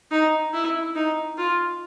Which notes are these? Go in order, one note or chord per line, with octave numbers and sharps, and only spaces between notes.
D#4
E4
D#4
F4